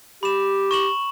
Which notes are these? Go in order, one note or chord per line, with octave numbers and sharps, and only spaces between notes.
G4 B5 E7
C#6 E7 F#7